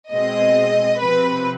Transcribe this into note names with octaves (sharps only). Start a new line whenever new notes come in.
B2 G#3 C4 D#5
C3 F3 C4 B4